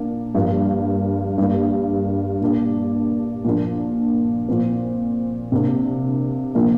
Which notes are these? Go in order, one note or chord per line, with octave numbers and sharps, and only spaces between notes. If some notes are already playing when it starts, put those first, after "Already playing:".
Already playing: A#2 A#3 D4
G2 F3 A#3
G2 G3 A#3
A#2 A#3 D4
A#2 F3 A#3 D4
A#2 F3 C4
C3 A#3 D4
A#2 F3 A#3 D4